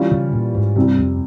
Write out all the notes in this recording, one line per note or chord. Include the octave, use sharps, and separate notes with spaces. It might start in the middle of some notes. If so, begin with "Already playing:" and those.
Already playing: E3 G3 C#4 F4
C#3
A#2
G#2
G2 C3 G3 C4
F2